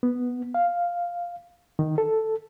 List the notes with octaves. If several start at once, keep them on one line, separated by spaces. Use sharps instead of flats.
B3
F5
D#3
A4